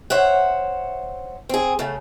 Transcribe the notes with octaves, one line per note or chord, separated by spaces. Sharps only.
C5 C#5 E5 F#5
C4 G#4
C#3 A3